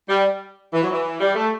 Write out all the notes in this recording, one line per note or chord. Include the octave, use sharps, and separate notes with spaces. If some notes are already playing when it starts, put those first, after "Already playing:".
G3
E3
F#3
E3
G3
A3